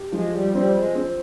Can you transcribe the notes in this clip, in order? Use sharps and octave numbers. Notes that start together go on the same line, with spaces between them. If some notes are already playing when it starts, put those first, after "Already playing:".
Already playing: G4
F3 G#3
G3
G3 C4
G#3
C4